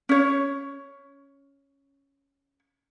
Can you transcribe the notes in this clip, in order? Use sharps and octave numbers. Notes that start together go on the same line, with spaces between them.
C#4 C#5